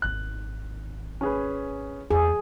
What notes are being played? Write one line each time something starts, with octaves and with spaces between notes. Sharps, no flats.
G#1 D#2 F#6
C#4 G#4 B4
E2 A#3 G#4